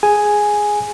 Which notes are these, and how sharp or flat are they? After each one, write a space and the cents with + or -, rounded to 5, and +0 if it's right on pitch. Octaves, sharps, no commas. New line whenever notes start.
G#4 +0 G#5 +0